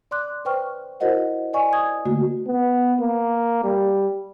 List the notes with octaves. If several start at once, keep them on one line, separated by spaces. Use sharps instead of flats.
D5 C6 D6 F#6
B4 C5 G5 C#6 F6
E4 F#4 A#4 C5 D#5 F#5
D5 D#5 G#5 C#6
D#6 G#6
D3 A3 A#3 F#4
B3
A#3
G3